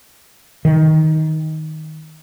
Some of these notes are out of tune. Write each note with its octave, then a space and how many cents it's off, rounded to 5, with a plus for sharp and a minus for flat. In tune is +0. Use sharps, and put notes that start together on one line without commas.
D#3 +10